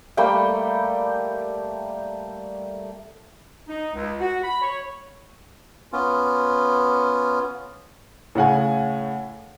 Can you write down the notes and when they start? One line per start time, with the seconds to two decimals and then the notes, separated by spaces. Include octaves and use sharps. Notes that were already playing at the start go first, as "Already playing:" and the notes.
0.17 G3 A3 A#3 G5
3.68 D#4
3.94 C#2
4.20 F#4
4.43 B5
4.62 C#5
5.92 B3 C#4 F4
8.35 A2 C#3 F#5 G#5